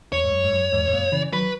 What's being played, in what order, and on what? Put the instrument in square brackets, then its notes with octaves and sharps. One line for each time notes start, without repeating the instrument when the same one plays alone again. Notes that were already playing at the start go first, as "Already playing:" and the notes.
[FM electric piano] E2 [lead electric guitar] C#5
[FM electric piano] G#2
F#2
G#2
F#2
E2 G#2
G#2
F#2 A#2
C#3 E3
[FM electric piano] D#3 F#3 [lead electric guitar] B4